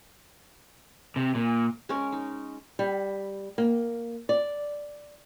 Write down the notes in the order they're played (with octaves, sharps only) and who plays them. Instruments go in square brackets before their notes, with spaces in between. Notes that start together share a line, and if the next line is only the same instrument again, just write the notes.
[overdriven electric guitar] C3
A#2
[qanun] G#3 C#4 A#4
D#4
[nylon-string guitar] G3
A#3
D5